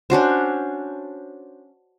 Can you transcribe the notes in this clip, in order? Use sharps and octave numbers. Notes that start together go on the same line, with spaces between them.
C#4 D4 F#4 C5